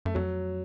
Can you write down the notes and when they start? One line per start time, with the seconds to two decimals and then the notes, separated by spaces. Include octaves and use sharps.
0.05 F#2 A3
0.15 F2 F#3